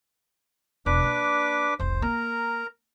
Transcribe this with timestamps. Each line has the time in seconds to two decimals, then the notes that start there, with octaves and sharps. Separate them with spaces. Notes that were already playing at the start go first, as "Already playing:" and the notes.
0.86 E1 D4 B4 D6
1.03 A#3
1.79 F1 C2 C5
2.02 A#3 A#4 A#5